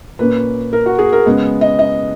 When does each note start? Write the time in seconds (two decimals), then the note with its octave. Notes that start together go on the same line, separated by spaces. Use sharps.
0.19 A#2 A#3 C#4 B4
0.73 A#4
0.86 F#4
0.99 G#4
1.13 A#4
1.26 C#3 G#3 B3
1.61 D#5
1.79 D#5